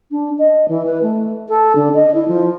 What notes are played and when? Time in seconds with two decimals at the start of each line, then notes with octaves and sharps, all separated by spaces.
0.11 D4
0.38 D#5
0.68 E3
0.86 B4
1.02 A3
1.48 A4
1.75 D3
1.94 D#5
2.14 E4
2.28 F3